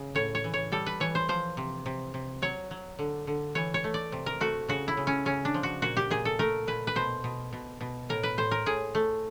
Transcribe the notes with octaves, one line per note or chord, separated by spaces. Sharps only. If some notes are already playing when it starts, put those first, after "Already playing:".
Already playing: C#3
A2 C#5
C#5
E3
C#5
G3 A4
B4
E3 C#5
C5
F3 C5
C3
C3
C3
F#3 C#5
F#3
D3
D3
E3 C#5
C#5
A3
D5
C3
A#4
A3 F#4
C#3 F#4
E4
C#3
C#4
C#3 C#4
D4
F3
F#4
A#2 F#4
G4
A#2 G#4
A4
A3 A#4
A#2 B4
B4
B2 C5
B2
B2
B2
A2 A#4
B4
A2 C5
A#4
A2 G#4
A3